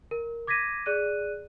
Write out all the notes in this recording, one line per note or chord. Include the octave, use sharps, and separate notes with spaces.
A#4
D6 G#6 A#6 B6 D#7
G#4 D5 F#6 D#7